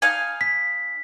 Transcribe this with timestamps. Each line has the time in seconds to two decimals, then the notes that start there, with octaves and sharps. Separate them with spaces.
0.02 D#4 F5 G#5
0.41 B6